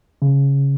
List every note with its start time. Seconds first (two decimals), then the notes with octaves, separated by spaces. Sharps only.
0.22 C#3